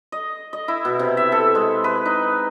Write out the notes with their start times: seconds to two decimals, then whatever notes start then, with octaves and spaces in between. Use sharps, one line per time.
0.12 D#5
0.53 D#5
0.68 E4
0.85 B2
0.99 C3
1.17 E5
1.32 A4
1.55 G#3
1.84 B4
2.05 D#4